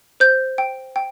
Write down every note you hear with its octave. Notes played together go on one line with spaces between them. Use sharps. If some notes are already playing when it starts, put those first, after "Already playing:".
C5 G6
G5
G5